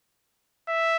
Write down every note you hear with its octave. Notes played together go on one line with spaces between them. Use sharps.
E5